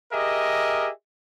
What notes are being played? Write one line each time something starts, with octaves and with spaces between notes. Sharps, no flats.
G4 G#4 A#4 D#5 E5